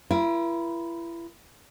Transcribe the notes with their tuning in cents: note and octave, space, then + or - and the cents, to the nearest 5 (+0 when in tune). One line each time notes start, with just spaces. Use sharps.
E4 +35 B4 -45